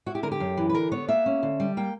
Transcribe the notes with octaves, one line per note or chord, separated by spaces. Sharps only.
E4 F#4
G4
D3 A#4
G4
F#2
E3
B4
D3 A#4
B3 C#5
A#3 E5
C#4
D3
G3
A#3 G5